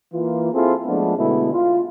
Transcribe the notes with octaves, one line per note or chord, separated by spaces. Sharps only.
E3 A#3 F4
C4 E4 F4 G#4 A4
F3 G#3 A3 B3 D4
B2 D3 G#3 A3 E4
F4